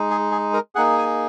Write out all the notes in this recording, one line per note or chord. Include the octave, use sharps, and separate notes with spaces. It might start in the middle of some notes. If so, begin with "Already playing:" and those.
Already playing: G#3 D#4
G#4
G#4
A#4
A#3 D#4 G#4 F#5
G#5